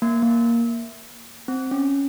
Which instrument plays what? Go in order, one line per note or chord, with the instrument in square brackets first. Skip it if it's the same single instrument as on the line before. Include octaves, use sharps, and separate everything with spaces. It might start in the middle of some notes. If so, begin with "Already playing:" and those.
[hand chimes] A#3
A#3
C4
C#4